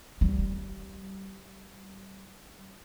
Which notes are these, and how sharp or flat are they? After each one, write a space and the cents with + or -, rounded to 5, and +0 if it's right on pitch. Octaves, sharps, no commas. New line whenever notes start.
G3 -25